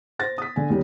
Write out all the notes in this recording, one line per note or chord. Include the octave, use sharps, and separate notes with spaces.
C5 A6 A#6
D#6 B6
D3 G#5
D#2 G3 C#4